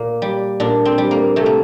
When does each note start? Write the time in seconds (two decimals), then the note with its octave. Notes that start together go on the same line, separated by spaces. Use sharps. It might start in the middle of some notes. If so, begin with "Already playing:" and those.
Already playing: A#2 A#3
0.22 G3
0.60 A#2 D4
0.85 C4
0.98 G3
1.11 A#3
1.36 C3 A3
1.46 A#3